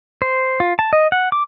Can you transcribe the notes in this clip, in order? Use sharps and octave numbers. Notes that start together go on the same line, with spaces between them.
C5
F4
A5
D#5
F#5
D6